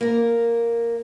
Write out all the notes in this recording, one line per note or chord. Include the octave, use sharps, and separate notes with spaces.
A#3 A#4